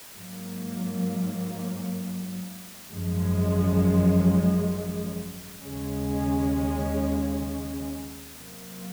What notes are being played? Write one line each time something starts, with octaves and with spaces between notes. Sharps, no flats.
G#2 F#3 A#3
G#1 F#2 F3 G#3
D#2 C#3 G#3 C#4
C3 F#3 A#3